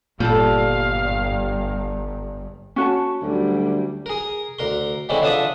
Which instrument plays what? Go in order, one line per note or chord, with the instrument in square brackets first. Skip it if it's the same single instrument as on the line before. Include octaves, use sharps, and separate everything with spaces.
[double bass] G1 G2 [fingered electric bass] A#2 [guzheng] G3 A4 A5 [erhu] F5
[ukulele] C#4 F#4 A5
[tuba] D2 [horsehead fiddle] F#3 G3
[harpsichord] G#4 A#4
D2 A#4 C6
D3 E3 G#3 C4 C#4 E4
D3 F3 D4 E5 A5 D#6